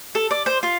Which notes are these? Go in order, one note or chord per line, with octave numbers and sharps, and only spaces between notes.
A4
D5
C5
F4